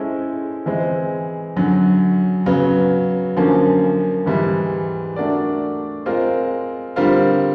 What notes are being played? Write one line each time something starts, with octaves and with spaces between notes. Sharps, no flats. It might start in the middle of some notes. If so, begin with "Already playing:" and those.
Already playing: G#3 C#4 E4 A4 C5
E3 G#3 C4
F#2 D3 F#3
C#3 F#3 B3
F#2 D3 F3 A#3 C#4
G#2 E3 G3
A3 D4 F#4 A#4 D5
G#3 C4 F4 A#4
D3 G3 C4 F4 A#4